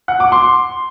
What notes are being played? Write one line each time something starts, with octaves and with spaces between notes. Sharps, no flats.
F#5
D6
C6